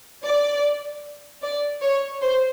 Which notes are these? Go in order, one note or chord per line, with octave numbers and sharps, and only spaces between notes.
D5
D5
C#5
C5